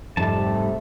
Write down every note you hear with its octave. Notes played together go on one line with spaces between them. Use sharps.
F2 G#2 C3 G3 A3 A5